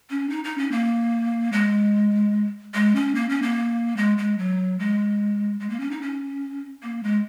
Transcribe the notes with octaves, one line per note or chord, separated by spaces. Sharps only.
C#4
D#4
D#4
C#4
A#3
G#3
G#3
C#4
A#3
C#4
A#3
G#3
G#3
F#3
G#3
G#3
A#3
C#4
D#4
C#4
A#3
G#3